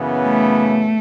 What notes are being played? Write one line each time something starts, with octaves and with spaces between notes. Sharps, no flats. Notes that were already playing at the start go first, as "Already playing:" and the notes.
Already playing: F#2 C#3 E3 B3
A3